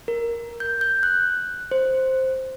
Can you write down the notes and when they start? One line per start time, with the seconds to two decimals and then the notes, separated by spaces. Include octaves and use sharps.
0.08 A#4
0.60 G6
0.81 G6
1.03 F#6
1.71 C5